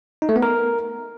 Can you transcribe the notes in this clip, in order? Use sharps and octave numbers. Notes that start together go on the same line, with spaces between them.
D#4
A3
B3
A#4